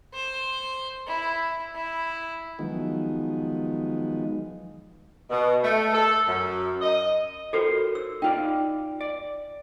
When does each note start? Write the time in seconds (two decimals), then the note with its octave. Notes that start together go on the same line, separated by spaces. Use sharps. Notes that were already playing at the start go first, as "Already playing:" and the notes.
0.14 C5
1.07 E4
1.75 E4
2.59 D#3 F3 F#3 G#3 B3 D#4
5.30 B2
5.63 A3
5.93 A4
6.27 F#2
6.81 D#5
7.53 F4 F#4 A4 A#4 C5 C#5
7.95 E6
8.22 D#4 F4 D5 G5
9.01 D5